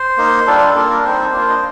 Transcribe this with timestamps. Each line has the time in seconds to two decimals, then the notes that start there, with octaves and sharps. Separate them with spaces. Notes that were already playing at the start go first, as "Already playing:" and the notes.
Already playing: C5
0.17 A#3 D#4
0.47 G3 D4 F4 A4
0.75 A#3 D4 F4 A4
0.90 A#4
1.03 G3 C4 D#4 C5
1.32 A#3 D4 F4
1.50 D#5